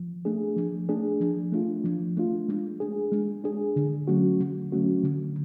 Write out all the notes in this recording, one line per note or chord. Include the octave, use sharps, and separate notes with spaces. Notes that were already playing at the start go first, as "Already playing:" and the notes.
Already playing: F3
A3 D4 G#4
F3
A3 D4 G#4
F3
A3 D4 F4
F3
A3 D4 F4
G#3
D4 G#4
G#3
D4 G#4
D3
F#3 A3 C#4 F#4
D3
F#3 A3 C#4 F#4
D3